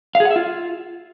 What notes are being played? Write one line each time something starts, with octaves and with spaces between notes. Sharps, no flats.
F5
G#4
F#5
E5
F4